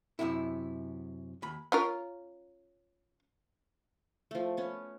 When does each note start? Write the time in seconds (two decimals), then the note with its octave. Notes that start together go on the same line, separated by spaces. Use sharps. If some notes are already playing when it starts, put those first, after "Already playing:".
0.19 F#2 A2 C3 E4
1.42 D#2 B5
1.72 C#4 F4 A#4
4.31 F3 A3
4.57 B3 C#4